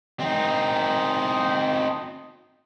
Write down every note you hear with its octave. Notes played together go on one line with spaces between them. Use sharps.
C4 D#4